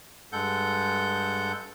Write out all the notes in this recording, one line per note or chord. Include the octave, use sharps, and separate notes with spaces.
G2 G#3 A4 F#5 G6